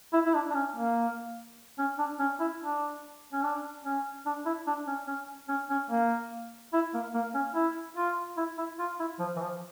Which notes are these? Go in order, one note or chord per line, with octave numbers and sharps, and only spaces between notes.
E4
E4
D4
D4
C#4
A#3
C#4
D4
C#4
E4
D4
C#4
D4
C#4
D4
E4
D4
C#4
C#4
C#4
C#4
A#3
E4
A#3
A#3
C#4
E4
F4
E4
E4
F4
E4
F3
E3
F3